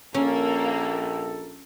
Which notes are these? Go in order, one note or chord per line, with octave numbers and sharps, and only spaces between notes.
A#1 A#3 C#4 A4